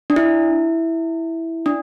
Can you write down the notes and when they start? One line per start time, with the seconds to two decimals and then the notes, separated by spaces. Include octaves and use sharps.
0.10 D4
0.16 E4
1.66 D4